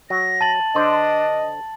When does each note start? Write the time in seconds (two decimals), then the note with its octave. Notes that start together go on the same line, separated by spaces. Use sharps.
0.10 F#3 A#6
0.41 A5 A6 F#7
0.75 D3 D4 A4 C5 D#5